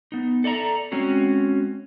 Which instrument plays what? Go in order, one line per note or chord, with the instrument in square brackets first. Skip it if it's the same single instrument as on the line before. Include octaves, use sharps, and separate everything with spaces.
[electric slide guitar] B3 D#4
A4 D5 E5 A#5
G#3 C4 C#4 F#4